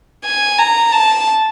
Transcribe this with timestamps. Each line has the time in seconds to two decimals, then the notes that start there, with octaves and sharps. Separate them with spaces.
0.25 G#5
0.59 A#5
0.92 A5